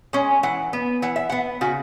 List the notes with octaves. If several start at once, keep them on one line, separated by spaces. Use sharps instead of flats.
G#3 C#4
E3 F#5
B3
E3 F#5
E5
B3 F#5
C#3 F#4